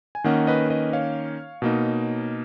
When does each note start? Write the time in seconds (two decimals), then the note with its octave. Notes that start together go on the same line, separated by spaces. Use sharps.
0.15 G#5
0.24 D#3 A#3 C#4 D#5 F#5
0.47 B4 D#5
0.70 B4 D#5
0.93 C#5 F5
1.62 B2 A#3 D#4